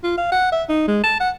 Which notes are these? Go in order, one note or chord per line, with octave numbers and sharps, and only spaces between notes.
F4
F5
F#5
E5
D#4
G#3
A5
F#5